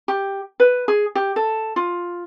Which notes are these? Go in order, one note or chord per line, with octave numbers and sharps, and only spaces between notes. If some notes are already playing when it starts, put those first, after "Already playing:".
G4
B4
G#4
G4
A4
F4